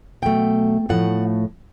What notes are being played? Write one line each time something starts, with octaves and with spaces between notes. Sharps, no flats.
B2 F#3 A3 G5
A2 F3 A3 F#5